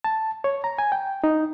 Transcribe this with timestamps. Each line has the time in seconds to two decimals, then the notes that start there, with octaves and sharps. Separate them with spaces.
0.04 A5
0.44 C#5
0.64 A#5
0.79 G#5
0.92 G5
1.24 D#4